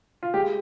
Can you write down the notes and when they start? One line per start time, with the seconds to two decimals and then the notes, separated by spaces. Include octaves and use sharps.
0.23 F4
0.34 G#3 G4